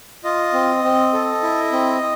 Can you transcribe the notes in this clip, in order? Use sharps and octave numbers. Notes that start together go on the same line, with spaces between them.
F4 D#5
C4
C4
A4
E4
C4